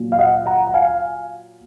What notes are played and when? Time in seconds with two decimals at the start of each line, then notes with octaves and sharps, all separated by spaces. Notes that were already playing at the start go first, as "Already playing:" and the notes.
Already playing: A#2 F#3
0.12 F5
0.19 D#5 F#5
0.46 F#5 A#5
0.67 F#5
0.74 F5 G#5